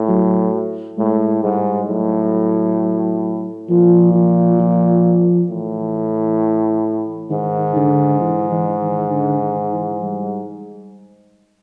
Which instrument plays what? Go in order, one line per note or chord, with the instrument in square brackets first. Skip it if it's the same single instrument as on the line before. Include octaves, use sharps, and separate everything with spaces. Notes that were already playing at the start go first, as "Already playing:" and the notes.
Already playing: [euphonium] A2
[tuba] F#3
[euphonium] A2 [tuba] G#3
[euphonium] G#2 [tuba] G3
[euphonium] A2 [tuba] F#3
[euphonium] A#2 [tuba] F3
[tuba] F3
F3
[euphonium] A2 [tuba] E3
[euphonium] G#2 [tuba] D#3
[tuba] D3
E3
E3
D#3
D3
D#3
E3
G3